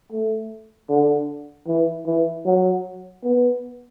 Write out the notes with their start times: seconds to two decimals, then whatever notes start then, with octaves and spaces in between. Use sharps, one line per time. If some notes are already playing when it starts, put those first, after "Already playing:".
0.12 A3
0.89 D3
1.67 E3
2.06 E3
2.45 F#3
3.23 B3